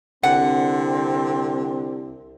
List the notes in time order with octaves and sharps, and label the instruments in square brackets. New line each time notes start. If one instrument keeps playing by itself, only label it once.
[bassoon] C2 [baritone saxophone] D3 [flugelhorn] C4 [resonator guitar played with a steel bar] F#5